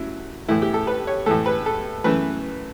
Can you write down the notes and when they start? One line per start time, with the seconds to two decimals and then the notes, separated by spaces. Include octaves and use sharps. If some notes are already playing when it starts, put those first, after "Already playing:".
Already playing: F#2 F#3 A3 E4
0.48 A2 E3 A3 E4
0.62 G4
0.74 A4
0.87 B4
1.07 C#5
1.26 A2 E3 A3 A4
1.46 B4
1.66 A4
2.04 F#2 E3 A3 B4